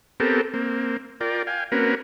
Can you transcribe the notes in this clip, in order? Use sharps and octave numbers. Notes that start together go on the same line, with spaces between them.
B3 C4 G4 A4 A#4
A#3 C4
F4 A#4 D5 G5
F5 G5 G#5
A#3 C4 C#4 F#4 A#4 B4